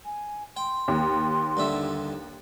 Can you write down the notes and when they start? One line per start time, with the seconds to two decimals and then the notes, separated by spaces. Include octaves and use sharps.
0.05 G#5
0.57 G5 C6
0.88 D#2
1.57 G2 D3 E5